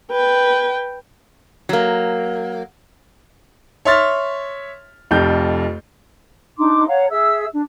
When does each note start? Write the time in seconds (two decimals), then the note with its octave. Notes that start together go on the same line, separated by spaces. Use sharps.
0.12 B4 G5
1.69 F#3 A#3
3.85 C#5 E5 C6 F6 A6
5.11 F1 F2 G4 G6
6.57 D4 D#4 C6 D6
6.87 C#5 F5 F#5 A#5
7.10 G#4 E5 E6
7.53 D4